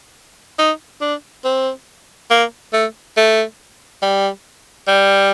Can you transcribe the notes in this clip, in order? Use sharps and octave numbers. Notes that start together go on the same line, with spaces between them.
D#4
D4
C4
A#3
A3
A3
G3
G3